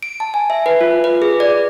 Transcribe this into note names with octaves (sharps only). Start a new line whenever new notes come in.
D7
A5
G#5
E5
B4
F4
B4
G#4
D5